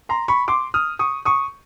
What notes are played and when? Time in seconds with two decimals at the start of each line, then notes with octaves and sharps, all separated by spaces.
0.09 A#5 C6
0.28 B5 C#6
0.48 C6 D6
0.74 D#6 F6
0.99 C#6 D#6
1.25 C#6 D#6